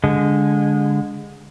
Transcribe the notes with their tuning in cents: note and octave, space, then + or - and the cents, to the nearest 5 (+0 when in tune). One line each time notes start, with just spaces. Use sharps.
D3 -25 G#3 -10